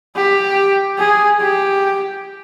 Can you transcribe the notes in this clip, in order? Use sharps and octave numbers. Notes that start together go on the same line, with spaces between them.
G4
G#4
G4